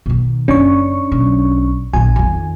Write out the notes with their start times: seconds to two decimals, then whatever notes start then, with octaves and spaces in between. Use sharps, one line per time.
0.06 B2 D#3
0.48 F#1 C#4 D4 C#6
1.12 B1
1.93 A#1 B3 G#5
2.16 F2 D#3